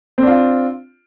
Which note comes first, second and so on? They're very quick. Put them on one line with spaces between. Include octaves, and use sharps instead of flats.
C4 D4 F4